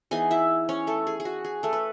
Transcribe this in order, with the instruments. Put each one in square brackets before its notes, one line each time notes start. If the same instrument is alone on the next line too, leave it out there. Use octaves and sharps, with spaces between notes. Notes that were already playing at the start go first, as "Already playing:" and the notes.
[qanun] E3 B3 D#4 G#4 G#5
E4 E5
C#4 C#5
A3 A4
G#4
G#4
F#4
G#4
A3 A4
B4